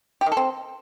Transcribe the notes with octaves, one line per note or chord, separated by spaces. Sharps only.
G4
D#3
A4
C4